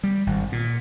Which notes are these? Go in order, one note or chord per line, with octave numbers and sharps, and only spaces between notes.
G3
G#1
A#2